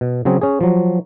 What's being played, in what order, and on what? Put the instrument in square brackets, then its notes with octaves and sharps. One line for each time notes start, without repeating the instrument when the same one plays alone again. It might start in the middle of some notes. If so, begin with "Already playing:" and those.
[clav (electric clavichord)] B2
C#3 F#3 C4 G#4
C#4 G#4
F3 F#3